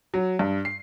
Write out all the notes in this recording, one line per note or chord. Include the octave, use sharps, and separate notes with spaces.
F#3
G2
C7